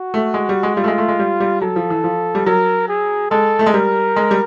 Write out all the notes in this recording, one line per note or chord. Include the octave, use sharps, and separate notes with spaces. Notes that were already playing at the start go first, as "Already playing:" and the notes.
Already playing: F#4
A3
G#3
G3
G#3
G3 F4
A3
G#3
A3
G#3
G3
G3
F#3 A4
F3
E3
F3
G3
F#3 A#4
G#4
G#3 A4
A3
G#3
G3 A#4
G#3
G3